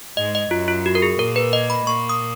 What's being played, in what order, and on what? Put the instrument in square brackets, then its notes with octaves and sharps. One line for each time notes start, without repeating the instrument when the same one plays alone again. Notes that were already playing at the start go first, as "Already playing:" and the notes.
[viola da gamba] G#2 G#3 [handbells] D#5
[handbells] D#5
[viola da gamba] F#2 F#3 [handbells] F4
[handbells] F4
F#4
A#4
G#4
[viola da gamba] A#2 A#3 [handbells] A#4
[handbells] B4
D#5
B5
[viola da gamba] A#2 A#3 [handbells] C#6
[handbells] D#6